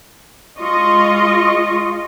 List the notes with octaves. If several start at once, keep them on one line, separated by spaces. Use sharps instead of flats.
G#3 F4 D#5 C#6